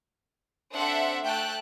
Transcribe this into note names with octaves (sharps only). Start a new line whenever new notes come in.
C4 D4 A4 C5 E5 F#5
A3 G5 A5 F#6